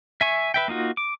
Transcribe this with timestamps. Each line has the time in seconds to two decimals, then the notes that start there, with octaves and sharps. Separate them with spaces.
0.21 E5 G#5 C#6
0.54 B4 E5 G5
0.68 A#3 D#4 F4 F#4
0.97 D6